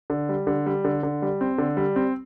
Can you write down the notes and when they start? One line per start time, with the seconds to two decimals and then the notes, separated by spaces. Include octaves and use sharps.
0.10 D3
0.29 G3
0.47 D3
0.66 G3
0.85 D3
1.03 D3
1.22 G3
1.41 C4
1.58 D3
1.77 G3
1.96 C4